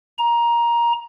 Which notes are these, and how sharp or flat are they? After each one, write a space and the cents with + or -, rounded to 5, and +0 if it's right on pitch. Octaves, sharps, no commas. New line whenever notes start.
A#5 +15